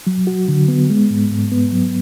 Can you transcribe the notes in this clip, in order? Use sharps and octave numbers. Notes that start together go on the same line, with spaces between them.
F#3
F#4
D3
B3
G#3
G#2
G#2
B3
F#3